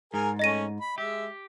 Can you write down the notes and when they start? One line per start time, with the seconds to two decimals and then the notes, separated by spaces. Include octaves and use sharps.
0.14 G#2 G#4 A#4 G#5
0.39 A3 C#4 D#5 A#6 D#7
0.81 B5
0.98 G#3 G4 E5